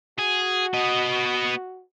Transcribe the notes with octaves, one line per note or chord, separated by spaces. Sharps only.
F#4 G#4
B3 D#5